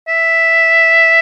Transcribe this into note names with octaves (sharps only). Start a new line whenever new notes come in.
E5